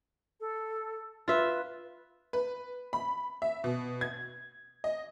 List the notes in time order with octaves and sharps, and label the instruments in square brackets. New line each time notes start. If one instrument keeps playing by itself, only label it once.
[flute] A4
[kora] F4 E5 [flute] B4
[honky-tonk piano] B4
B5
E5
B2
G#6
D#5